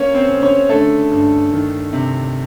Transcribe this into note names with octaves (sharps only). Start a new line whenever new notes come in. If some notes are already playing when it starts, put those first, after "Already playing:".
Already playing: A#3 C#4 C#5
C4 C5
C#3
C#4 C#5
D3 A3 A4
G2
D#3
C3